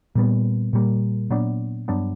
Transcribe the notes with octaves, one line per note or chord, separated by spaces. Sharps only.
A#2 G3 B3
A#2 G3 A#3
A#2 F#3 B3 D4
G2 F#3 B3 D4